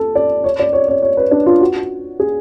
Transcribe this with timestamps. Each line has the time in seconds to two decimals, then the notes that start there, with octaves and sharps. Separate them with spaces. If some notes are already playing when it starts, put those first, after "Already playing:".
Already playing: A4
0.15 D5
0.44 C#5
0.59 D5
0.73 C#5
0.88 C#5
1.02 C#5
1.17 B4
1.31 D4
1.46 F4
1.61 F#4
2.20 G#4